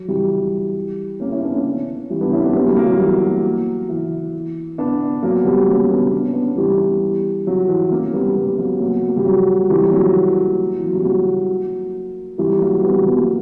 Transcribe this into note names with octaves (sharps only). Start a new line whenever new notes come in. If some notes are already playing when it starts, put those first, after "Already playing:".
Already playing: F#3
E3 G3
A#3 C#4
C#4 E4
B3 D4
A#3 C#4
E3 G3
B3 D4
C#4 E4
B3 D4
G3 B3
F#3 A#3
F#3 A#3
E3 G3
F#3
E3
B3 D4
F#3 A#3
G3 B3
A#3 C#4
B3 D4
D4
C#4
B3 D4
E3 G3
F#3
E3
A#3 C#4
G3 B3
G3 B3
F#3 A#3
F#3 A#3
A#3
G3
F#3
E3 G3
F#3 A#3
E3
F#3
G3
F#3 A#3
E3 G3
F#3 A#3
G3 B3
F#3 A#3
G3 B3
F#3 A#3